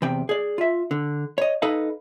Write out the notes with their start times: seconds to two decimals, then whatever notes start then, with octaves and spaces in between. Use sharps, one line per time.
0.02 E2 C3 G5
0.29 G#4 D5
0.58 F4 E5
0.91 D3
1.38 C#5 D#5
1.62 D#4 A4 B4 D#5 F5